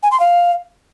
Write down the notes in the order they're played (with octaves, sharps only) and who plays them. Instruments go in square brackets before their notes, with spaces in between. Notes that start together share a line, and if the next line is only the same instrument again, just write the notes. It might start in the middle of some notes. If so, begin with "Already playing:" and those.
[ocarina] G#5
C6
F5